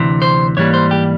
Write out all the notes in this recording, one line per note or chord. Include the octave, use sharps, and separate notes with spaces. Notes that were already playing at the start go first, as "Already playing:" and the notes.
Already playing: D2 C3 E3
C5
G#2 E3 G3 A#3 C#5
C5
G4